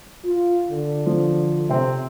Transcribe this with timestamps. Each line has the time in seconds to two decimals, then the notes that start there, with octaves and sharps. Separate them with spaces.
0.25 F4
0.71 D3
1.06 F3
1.69 C3 C4